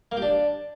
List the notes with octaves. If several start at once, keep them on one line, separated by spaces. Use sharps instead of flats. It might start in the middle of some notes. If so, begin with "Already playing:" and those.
A#3
G4
D4